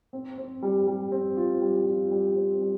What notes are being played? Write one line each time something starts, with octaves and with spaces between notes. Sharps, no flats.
C4
C4
G3
G3
C4
F4
G3
F4
G3
C4
G3